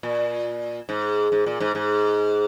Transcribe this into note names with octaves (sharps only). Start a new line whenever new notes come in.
A#2
G#2
G#2
A#2
G#2
G#2